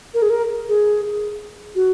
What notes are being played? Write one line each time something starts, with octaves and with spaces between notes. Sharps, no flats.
A#4
G#4
A#4
G#4
F#4